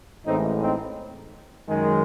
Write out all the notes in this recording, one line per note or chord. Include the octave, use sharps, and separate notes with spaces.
A1 A2 E3 G#3 C4 D#4
C4 D#4
F#2 D#3 G#3